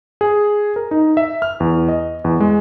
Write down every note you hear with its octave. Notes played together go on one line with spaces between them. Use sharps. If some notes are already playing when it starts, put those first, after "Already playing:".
G#4
A#4
D#4
E5
F6
E2
D#5
E2
G#3